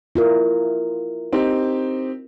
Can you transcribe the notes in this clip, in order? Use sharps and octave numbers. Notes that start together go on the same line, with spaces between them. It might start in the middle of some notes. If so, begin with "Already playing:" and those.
E4 F4 A#4
C4 D#4 G4